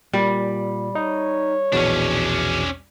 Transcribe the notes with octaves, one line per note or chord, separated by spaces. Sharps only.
A#2 G3
D#4 C#5
A#1 E2 B2 C#4 D4